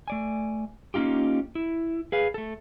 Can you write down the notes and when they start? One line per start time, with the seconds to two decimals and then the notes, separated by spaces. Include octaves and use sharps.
0.08 A3 D5 G#5
0.94 A#3 C#4 D#4 F4 G4
1.55 E4
2.12 G#4 B4 F5
2.34 A3 A4